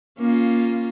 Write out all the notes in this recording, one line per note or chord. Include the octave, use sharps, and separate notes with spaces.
A#3 C#4 F4